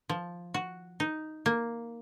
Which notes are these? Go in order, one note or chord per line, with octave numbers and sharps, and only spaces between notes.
F3
F#4
D#4
A#3